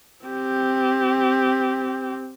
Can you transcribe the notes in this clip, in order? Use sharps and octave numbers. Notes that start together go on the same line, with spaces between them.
C4 G4